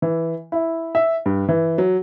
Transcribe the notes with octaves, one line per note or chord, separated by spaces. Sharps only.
E3
E4
E5
G2
E3
F#3